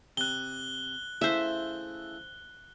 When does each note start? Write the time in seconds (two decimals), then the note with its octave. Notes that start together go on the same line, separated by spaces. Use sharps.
0.17 C3 F#6 G7
1.21 C#3 A3 E4 C5 E5